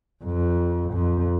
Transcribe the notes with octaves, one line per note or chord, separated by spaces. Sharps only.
F2
F2